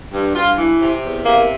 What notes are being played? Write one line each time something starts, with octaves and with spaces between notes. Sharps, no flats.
G2
G2 F4
E3
C3
E2
C3 A#3